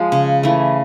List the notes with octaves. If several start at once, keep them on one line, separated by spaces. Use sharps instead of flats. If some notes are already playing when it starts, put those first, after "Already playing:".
Already playing: F3 G#3
C#3
E3 A3